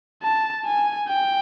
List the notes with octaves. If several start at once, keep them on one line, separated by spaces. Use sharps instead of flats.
A5
G#5
G5